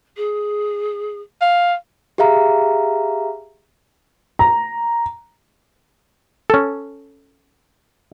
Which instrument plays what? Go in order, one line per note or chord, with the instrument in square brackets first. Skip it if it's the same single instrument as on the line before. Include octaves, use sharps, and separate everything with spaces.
[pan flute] G#4
[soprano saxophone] F5
[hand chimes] G4 G#4 E5 F5 A#5
[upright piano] A#5
[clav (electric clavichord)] C#4 A4